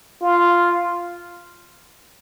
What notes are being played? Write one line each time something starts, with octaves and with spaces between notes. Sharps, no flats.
F4